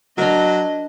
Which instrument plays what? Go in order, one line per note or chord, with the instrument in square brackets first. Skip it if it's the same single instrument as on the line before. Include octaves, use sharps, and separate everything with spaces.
[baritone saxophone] F#3 [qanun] D4 A#4 [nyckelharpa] D#5